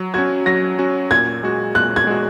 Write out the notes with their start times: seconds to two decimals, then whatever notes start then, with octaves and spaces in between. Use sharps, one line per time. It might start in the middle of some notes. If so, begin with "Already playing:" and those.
Already playing: F#3
0.14 C#4 F#4 G#6
0.46 F#3 A#6
0.79 C#4 F#4
1.11 A#2 G#6
1.43 G#3 F#4
1.75 A#2 F#6
1.96 G#6
2.07 G#3 F#4